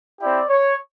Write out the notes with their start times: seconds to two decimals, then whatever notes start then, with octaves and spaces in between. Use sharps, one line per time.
0.20 C4 E4 G4 D5
0.49 C#5